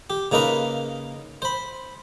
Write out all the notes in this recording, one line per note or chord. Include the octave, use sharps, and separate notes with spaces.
G4
C#3 A#3 D#4 A#4 B4
C5 B5